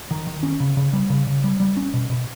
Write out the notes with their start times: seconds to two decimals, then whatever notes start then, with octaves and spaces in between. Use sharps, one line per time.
0.11 D#3
0.27 D#3
0.43 C#4
0.60 C#3
0.77 C#3
0.93 G3
1.10 C#3
1.27 C#3
1.44 G3
1.60 G3
1.77 C#4
1.93 B2
2.10 B2